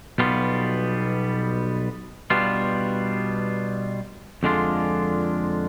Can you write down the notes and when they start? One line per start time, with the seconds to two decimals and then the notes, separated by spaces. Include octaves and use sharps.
0.18 B1 B2 G3 B3 F4
2.30 B2 G3 B3 D4 F4
4.43 F2 D3 G#3 D4 F4